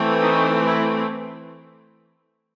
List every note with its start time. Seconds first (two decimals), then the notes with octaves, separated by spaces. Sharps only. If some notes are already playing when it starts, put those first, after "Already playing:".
Already playing: E3 A3 C4
0.21 D#4
0.65 E4